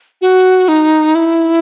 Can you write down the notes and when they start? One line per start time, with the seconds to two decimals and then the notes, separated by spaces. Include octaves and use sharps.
0.21 F#4
0.68 D#4
1.15 E4